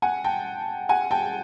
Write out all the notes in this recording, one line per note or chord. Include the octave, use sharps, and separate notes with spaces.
F#5 G#5
G5 A5
F#5 G#5
G5 A5